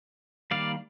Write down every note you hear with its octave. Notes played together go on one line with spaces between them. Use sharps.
D#3 G3 A#3 D5 F5